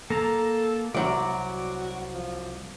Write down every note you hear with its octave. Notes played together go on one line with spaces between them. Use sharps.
A#3 A4 A#5
C2 F#3 F#4 D5
F3